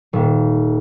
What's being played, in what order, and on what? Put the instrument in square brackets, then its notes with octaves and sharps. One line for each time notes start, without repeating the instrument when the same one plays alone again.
[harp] D#1